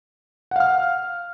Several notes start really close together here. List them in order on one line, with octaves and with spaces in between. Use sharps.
F#5 F5 F6